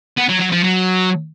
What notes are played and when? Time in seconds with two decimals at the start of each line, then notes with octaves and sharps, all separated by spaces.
0.17 B3
0.29 F#3
0.40 F#3
0.52 F3
0.63 F#3